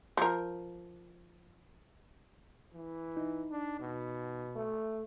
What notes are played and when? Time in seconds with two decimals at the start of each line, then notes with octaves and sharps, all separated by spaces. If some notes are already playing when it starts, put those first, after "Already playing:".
0.17 F3 A#4
2.74 E3
3.17 D#4
3.51 D4
3.80 B2
4.55 A3